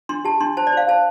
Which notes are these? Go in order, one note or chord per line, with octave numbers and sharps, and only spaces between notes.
D4 C6
G4 A5
D4 C6
C5 A5
D5
C5 F5
C5 A5